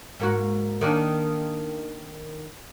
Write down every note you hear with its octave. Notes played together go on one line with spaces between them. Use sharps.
G#2 A#3 F#4
D#3 A#3 D4